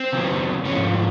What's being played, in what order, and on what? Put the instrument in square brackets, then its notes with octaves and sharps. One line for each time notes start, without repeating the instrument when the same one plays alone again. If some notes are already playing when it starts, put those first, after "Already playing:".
Already playing: [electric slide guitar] C4
C#3 F#3 B3
G#2 F3 A3 C#4